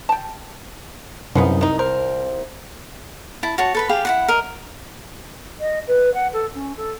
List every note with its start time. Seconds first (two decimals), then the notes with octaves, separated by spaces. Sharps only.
0.09 G5 A5
1.35 C2 F#2 F3 B3 D#4
1.61 D#3 D#4
1.79 A#4 C5
3.43 E4 A5
3.58 F#4 C#5 A5
3.75 A4 B4 B5
3.89 G4 G#4 F5
4.05 E4 F#4 F#5
4.28 A#4 D#5
5.60 D#5
5.87 B4
6.14 F#5
6.33 A4
6.55 C#4
6.77 A4